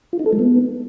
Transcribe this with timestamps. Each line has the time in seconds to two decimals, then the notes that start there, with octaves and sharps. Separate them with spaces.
0.13 F4
0.19 D#4
0.26 A4
0.33 G#3
0.39 B3